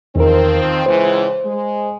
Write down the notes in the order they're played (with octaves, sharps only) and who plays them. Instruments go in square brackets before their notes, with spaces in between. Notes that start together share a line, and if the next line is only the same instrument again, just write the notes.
[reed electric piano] E2 A#4 [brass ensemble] D#3 F3 C4
[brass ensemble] C#2 E3 [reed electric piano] C5
[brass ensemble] G#3